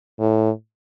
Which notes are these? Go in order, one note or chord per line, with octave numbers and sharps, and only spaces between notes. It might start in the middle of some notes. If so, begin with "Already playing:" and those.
A2